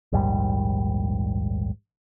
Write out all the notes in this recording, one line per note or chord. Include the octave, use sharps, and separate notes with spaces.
A#1 D#2 G#2 G3